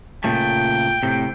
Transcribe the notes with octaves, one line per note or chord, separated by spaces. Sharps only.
A#2 C#3 A3 G5
A2 C3